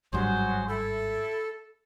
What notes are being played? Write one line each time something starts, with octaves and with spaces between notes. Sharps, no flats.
G#1 G2 F#3 G3 F#4 G#4 C5
E4 A4